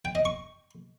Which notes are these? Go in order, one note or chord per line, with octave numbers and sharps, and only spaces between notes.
G5
D#5
C#6